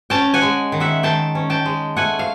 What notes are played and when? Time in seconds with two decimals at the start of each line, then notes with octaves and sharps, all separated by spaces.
0.10 C#4 G5 A5
0.34 F#5 G#5
0.42 G#3
0.72 D#3
0.80 E5 F#5
1.03 D#3 G5 A5
1.35 C#4
1.50 G5 A5
1.65 G#3
1.96 A3 F#5 G#5
2.19 F5